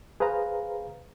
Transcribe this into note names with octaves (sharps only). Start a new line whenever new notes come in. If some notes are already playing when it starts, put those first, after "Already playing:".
G#4 B4 C5 F5 A#5